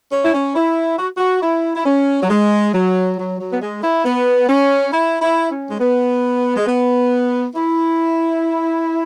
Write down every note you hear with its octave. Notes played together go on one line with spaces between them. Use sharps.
C#4
E4
C#4
E4
F#4
F#4
E4
E4
C#4
F#3
G#3
F#3
F#3
F#3
B3
G#3
E4
B3
C#4
E4
E4
C#4
G#3
B3
G#3
B3
E4